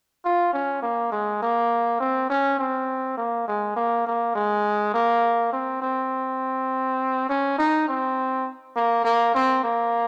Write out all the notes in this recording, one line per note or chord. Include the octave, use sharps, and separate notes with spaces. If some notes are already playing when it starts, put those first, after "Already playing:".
F4
C#4
A#3
G#3
A#3
C4
C#4
C4
A#3
G#3
A#3
A#3
G#3
A#3
C4
C4
C#4
D#4
C4
A#3
A#3
C4
A#3